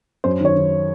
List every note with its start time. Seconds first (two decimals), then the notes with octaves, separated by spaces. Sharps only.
0.24 F#2 C5
0.40 D#3 C#5
0.56 D#3